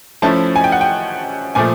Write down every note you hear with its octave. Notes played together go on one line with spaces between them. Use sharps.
F3 A3 C#4 E4 A5
G#5
G5
F#5
G5
A#2 F3 A3 G#5